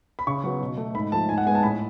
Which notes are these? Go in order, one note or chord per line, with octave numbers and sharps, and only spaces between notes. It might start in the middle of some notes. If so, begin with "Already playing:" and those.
B5
C#3 C#6
F#3 B3
B2
A3
G#2 B5
F3 A3 A5
G#2 G#5
F#5
G#3 B3 G#5
A5
A2 B5